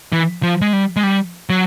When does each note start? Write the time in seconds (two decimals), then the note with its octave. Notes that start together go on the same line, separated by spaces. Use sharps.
0.12 E3
0.43 F3
0.61 G#3
0.73 G3
0.96 G#3
1.03 G3
1.50 F#3